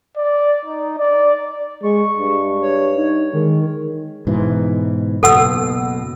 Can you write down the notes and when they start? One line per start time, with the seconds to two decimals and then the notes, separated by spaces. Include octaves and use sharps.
0.17 D5
0.65 D#4
0.98 D5
1.83 G#3 C#6
2.18 G2
2.62 C#5
2.96 D#4
3.33 D#3 G#3
4.27 G#2 B2 E3
5.23 F#1 B2 A4 F#5 E6